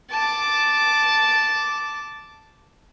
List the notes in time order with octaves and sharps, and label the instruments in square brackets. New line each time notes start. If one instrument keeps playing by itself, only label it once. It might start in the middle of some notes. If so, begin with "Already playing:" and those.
[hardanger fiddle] A5 D6